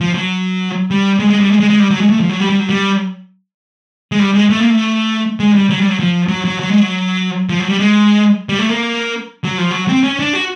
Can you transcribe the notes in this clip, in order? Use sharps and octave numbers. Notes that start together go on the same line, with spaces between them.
F3
F#3
G3
G#3
G#3
G3
G#3
G#3
G#3
G3
F#3
G#3
A3
F3
F#3
G3
G3
F#3
G3
G#3
G3
G#3
A3
A#3
A3
G#3
G3
F#3
G3
F#3
F3
F#3
F#3
F#3
G#3
F#3
F3
F#3
G3
G#3
G3
A3
A#3
F#3
F3
F#3
C4
C#4
D4
F#4